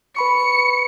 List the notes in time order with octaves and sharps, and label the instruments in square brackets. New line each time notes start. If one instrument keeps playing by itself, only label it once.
[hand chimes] B4 B5 C#6 [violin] C#7